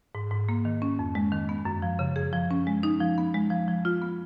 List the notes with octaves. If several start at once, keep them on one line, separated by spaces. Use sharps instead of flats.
G#2
G#2
A#3
D#3
C#4
F2
G#3
D#3
B3
F#2
F3
C#3
G#4
F3
C#4
G#3
D#4
F3
B3
G#3
F3
F3
F4
B3